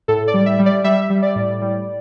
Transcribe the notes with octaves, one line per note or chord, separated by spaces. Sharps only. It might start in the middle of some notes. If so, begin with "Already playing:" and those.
A2 A4
D5
G3
E5
G3
D5
G3 E5
G3
D5
A2
G3